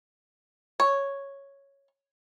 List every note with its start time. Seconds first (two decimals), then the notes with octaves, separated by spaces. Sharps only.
0.80 C#5